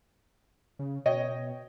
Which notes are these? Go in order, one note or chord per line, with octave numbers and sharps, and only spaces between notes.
C#3
B2 C#5 D#5 G5